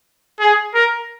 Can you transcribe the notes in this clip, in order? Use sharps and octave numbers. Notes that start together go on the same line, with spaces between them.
G#4
A#4